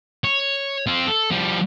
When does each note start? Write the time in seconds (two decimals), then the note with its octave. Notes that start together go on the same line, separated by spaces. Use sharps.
0.24 C#5
0.87 C4 F4
1.07 A4
1.31 F3 G3